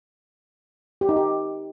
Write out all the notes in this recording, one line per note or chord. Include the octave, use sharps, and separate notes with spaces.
G4
D#4
G4